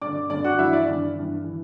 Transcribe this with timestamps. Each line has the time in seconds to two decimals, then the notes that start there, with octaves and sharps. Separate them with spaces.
0.02 G2 D3 D5 D6
0.30 G2 D3 D5 D6
0.44 F#4 F#5
0.58 G2 E3 E4 E5
0.73 D5
0.87 G2 E3
1.15 G2 E3
1.44 E3